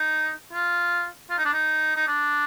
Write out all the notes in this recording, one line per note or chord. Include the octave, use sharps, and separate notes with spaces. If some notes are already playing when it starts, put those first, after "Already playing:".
Already playing: D#4
F4
F4
D#4
D4
D#4
D#4
D4